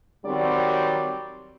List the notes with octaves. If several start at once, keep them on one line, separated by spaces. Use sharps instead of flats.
D#3 F#3 G3 C4 D5